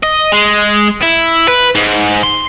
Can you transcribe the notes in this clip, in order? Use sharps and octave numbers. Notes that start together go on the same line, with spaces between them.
D#5
G#3
E4
B4
G#2
C6